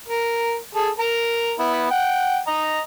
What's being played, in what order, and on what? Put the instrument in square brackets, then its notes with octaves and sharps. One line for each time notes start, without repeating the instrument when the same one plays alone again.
[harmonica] A#4
G#4 A4
A#4 A#5
B3 E4
F#5 G5
D#5 A#5